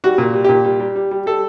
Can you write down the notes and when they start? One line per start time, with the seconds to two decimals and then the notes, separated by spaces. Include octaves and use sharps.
0.04 G3 F#4
0.18 A#2
0.33 G3
0.45 A#2 G4
0.65 G3
0.80 G3
0.96 G3
1.11 G3
1.26 G3 A4